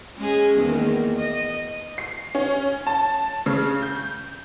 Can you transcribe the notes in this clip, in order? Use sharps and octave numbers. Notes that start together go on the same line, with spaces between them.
G#3 C#4 G#4
E2 D#3 A#3
D#5
C7
C#4
A5
C#3
G6